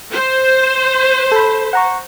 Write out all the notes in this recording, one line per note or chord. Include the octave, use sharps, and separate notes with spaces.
C5
A4 B5
F#5 A#5 C#6